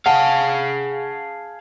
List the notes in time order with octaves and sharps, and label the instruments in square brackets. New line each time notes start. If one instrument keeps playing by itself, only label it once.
[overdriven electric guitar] G#4 F5 [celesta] F#5 [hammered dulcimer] A5